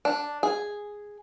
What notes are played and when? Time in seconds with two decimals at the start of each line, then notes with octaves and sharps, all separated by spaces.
0.05 D4
0.43 G#4